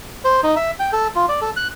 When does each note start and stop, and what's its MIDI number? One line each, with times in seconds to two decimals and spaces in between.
0.25 0.41 72
0.43 0.55 63
0.56 0.71 76
0.79 0.91 79
0.93 1.08 69
1.16 1.26 65
1.29 1.40 74
1.41 1.51 69
1.56 1.68 90